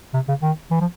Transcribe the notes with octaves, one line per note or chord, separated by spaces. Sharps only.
C3
C#3
D#3
E3
F3